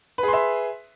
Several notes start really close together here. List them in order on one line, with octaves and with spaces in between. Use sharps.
B4 G#4 C6 E5